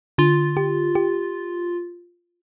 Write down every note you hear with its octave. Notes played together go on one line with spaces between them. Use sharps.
D3 F4
G4
G4